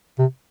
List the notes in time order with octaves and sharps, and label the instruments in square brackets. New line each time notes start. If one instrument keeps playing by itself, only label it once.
[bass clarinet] C3